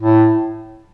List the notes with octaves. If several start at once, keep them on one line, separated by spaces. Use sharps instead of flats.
A2